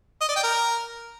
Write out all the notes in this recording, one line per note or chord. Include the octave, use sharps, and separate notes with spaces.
D#5
D5
G5
A#4